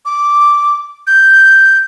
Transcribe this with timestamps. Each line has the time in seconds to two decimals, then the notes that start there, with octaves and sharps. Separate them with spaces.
0.05 D6
1.07 G6